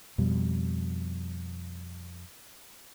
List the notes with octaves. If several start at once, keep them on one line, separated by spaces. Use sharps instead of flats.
F2 B2 G3